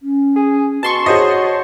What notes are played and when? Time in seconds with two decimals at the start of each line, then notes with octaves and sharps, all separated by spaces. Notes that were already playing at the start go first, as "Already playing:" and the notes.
0.01 C#4
0.36 G#4
0.83 B2 A5 C6 C#6
1.06 F#4 G#4 C5 C#5 D#5